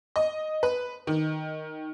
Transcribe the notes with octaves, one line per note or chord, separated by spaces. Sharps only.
D#5
B4
D#3